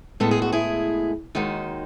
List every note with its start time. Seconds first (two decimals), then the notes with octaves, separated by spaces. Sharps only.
0.20 A2 G#3 B3 A4
0.31 G#4
0.42 F#4
0.53 E4 G#4
1.35 D#2 D#3 G#3 D#4 F#4